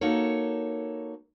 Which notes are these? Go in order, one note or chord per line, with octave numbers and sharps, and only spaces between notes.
A#3 D#4 F#4 A4 A#4 C#5